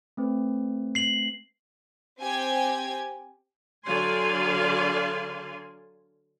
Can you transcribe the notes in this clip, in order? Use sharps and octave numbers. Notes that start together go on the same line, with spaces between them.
A3 C4 B4
C7 F#7
C4 G4 G5 G#5 G#6
D3 F#3 D5 F5 G#5 C6